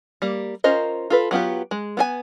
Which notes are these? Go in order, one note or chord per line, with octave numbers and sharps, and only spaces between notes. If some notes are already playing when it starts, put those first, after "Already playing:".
G3 A#3
C#4 F4 A#4 C5 D#5
F4 A4 B4
F#3 B3 F4 G4
G#3
B3 G#4 G#5